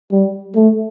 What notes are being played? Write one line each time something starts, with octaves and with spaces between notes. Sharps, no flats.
G3
A3